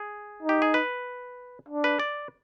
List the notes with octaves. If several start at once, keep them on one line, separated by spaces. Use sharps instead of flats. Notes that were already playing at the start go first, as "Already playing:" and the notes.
Already playing: G#4
D#4
G4
G#4
B4
D4
B4
D5